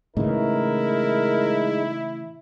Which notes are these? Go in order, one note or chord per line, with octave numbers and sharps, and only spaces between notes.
A2 C#3 E3 G#3 D#4 E4 A#4